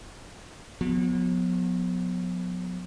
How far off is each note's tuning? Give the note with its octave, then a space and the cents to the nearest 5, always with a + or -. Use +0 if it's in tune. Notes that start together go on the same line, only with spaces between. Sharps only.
F#3 -45 B3 +0